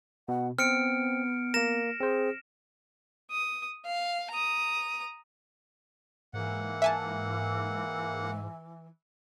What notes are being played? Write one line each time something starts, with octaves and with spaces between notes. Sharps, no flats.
B2 F#5
B3 C4 F6 C#7 D7
A#3 A#4 A#6 E7
C4 G#4 C5
D#6
F5
A#5 D#6
G#2 E3 A#3 F#5
E5 G#5 A5